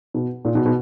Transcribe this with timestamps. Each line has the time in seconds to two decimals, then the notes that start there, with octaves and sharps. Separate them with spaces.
0.14 B2
0.45 A#2
0.55 B2
0.66 B2